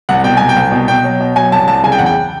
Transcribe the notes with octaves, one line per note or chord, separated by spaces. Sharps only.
C2 F#5
B2 G5
C2 G#5
G5
C2
B2
B2 G5
F#3
B2
F#3 G#5
C2 A5
C2 A5
C#3 G#5
G5
E2 F#5
G5